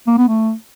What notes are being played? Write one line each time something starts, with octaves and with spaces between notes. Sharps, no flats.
A#3
B3
A3